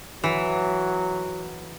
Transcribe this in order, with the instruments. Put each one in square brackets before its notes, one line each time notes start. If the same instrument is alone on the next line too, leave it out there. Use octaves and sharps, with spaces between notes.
[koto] E3 [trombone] F#3